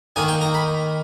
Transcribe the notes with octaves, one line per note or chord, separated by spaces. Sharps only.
D#3 A#3 D#4 G#5
G5
A#5
B5